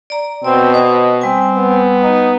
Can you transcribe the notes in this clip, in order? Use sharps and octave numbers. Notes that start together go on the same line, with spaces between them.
D5 A#5
B2 C4 D5 G5
C5 D#5
G3 C4 G#5
B3
D#4